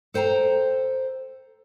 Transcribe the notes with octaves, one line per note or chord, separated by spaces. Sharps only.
A4 C5 G5 A#5